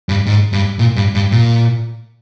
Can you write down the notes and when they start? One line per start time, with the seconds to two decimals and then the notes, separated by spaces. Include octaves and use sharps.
0.09 G2
0.27 G#2
0.53 G2
0.79 A#2
0.96 G2
1.15 G2
1.32 A#2